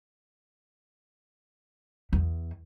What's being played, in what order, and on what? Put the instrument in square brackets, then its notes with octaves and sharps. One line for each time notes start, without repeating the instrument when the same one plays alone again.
[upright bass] E2